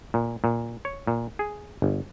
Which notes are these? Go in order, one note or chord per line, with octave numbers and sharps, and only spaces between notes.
A#2
A#2
C#5
A#2
G#4
G1